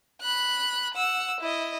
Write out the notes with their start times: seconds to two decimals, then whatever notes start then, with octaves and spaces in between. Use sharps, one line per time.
0.21 B5 F#6
0.95 F#5 E6
1.40 E4 D#5